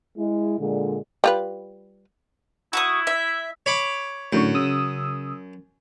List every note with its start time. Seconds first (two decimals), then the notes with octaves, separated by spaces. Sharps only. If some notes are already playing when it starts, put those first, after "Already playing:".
0.17 G#3 E4
0.58 A#2 D3 G#3
1.24 G3 F4 B4
2.73 E4 F#4 C#6 D#6
3.07 E5
3.66 C#5 B5 D6
4.33 F#2 A2 D3 C#6
4.54 C#3 D#6 E6